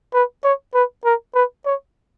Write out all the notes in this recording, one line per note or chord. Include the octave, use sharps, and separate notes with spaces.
B4
C#5
B4
A#4
B4
C#5